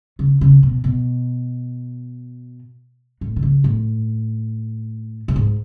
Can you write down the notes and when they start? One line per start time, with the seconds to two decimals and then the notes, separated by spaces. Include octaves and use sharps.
0.19 C#3
0.41 C#3
0.63 B2
0.84 B2
3.21 A2
3.36 D3
3.43 C#3
3.64 A2
5.28 A2
5.36 G#2